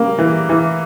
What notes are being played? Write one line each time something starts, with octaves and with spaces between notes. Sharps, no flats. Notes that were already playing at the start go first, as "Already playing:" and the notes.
Already playing: C#3 G3 A#3
E3
E3